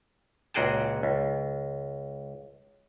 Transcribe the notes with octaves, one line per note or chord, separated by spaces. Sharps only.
C#2 A#2 F#4 G#4 G5 A5
C#2